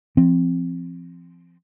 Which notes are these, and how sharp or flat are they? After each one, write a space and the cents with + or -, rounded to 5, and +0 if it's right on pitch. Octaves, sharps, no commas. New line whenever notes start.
F3 -30 C4 +0